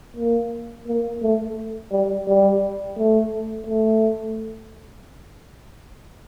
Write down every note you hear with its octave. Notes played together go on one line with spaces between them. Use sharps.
A#3
A#3
A3
G3
G3
A3
A3